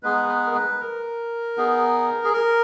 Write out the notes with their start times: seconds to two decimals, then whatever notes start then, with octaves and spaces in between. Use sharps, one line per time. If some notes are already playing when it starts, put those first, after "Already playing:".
0.03 G#3 B3 D#4 G#4 B4
0.29 B4
0.46 A#4
0.55 B4
0.80 A#4
1.57 B3 D#4 G#4
2.24 G#4
2.33 A#4